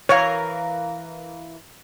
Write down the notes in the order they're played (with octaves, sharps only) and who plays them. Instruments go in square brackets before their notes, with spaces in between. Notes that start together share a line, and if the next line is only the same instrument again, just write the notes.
[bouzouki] E3 A#4 F5 [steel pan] C#5